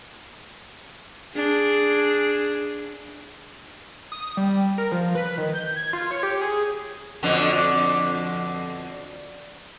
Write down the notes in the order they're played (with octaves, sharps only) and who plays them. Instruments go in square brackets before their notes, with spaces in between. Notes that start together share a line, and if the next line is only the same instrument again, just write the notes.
[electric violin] D4 G#4
[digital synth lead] D#6
G3
A#4
F3
B4
D#3
G6
G#6
F4
C#5
G4
G#4
[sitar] F2 B2 D3